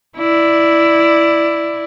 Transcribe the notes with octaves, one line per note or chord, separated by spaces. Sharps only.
E4 D5